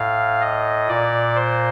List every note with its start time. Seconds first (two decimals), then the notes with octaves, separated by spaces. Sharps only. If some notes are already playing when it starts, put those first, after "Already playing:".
Already playing: A2 F5
0.41 D#5
0.88 A#2 D5
1.35 C5